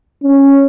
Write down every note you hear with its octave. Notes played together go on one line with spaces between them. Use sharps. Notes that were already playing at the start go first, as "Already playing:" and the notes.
C#4